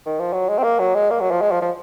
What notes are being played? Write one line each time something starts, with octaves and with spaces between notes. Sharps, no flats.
D#3
F3
F#3
G#3
C4
A#3
F#3
G#3
A#3
F#3
F3
G#3
F3
F3